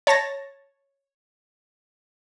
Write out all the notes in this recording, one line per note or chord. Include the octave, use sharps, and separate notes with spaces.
C#5 A5 A6 A#6